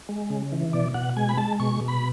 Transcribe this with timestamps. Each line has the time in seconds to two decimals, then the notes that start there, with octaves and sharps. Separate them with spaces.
0.09 G#3
0.30 C#3
0.52 E3
0.73 B2 D5
0.94 B2 F#5
1.17 G#3 G#5
1.29 B5
1.37 G#3 A5
1.60 B2 C#6
1.81 B2
1.88 B5